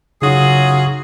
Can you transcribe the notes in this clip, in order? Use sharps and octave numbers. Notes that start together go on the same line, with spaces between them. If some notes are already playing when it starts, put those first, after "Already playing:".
F#2 C#3 F#3 D#4 F4 F#4 G#4 D#6